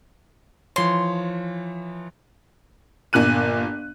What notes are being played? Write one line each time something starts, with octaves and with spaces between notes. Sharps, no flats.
E3 F3 C#5 C6
G1 A#2 F#6 D#7